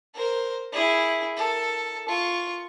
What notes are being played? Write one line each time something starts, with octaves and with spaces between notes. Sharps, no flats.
A#4 C5
E4 G#4
A4 A#4
F4 C#6